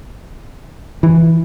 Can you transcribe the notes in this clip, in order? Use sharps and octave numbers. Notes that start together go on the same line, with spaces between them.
E3